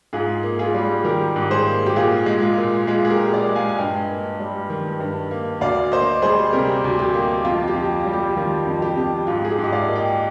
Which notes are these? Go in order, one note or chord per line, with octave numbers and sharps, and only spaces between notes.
G#2 F4 G#4
A#3
F4 G#4
G3
D#3 G4 A#4
G#2
G#4 C5
A#3
G4
A#2 F4 G#4
G#3
F4
A#2
G#3 F4 G#4
G#4
G4 A#4
A#2
A#4 D5
G#3
F5 G#5
G#5
G2 D#5 G5
A#3
G3
D#3
G2
A#3
D2 D5 F5
A#3 C5 D#5
G3 G#4 C5
C3 G4 A#4
D2
G4
A#3
F2 F4
G4
F2
F4
G3
G4
D#3 F4
F2
G4
F2
G#2 F4
G#4
G4
G#2
D#5
D5 F5
A#3
D#5 G5